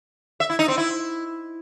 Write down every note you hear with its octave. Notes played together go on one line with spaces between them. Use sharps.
E5
E4
D#4
C4
E4